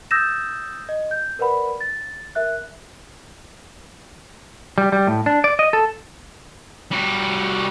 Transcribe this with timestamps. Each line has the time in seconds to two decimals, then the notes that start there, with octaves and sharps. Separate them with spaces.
0.11 D#6 E6 G6 A6 A#6 E7
0.89 D#5
1.11 G6
1.39 A#4 B4 D5 F#5 B5
1.81 A6
2.35 A#4 E5 F#6
4.78 G3
4.92 G3
5.07 A2
5.26 D4
5.44 D5
5.59 D#5
5.73 A4
6.91 G3 F#4